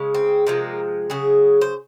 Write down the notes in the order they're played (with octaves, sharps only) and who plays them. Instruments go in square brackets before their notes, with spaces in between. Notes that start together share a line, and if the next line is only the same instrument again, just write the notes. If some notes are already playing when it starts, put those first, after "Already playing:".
Already playing: [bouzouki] C#3 G#3
C4
C3 F3 G#3 A#3
C#3 F#3 G#4
C5